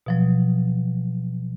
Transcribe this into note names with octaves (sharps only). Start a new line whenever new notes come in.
B2 F3 F#3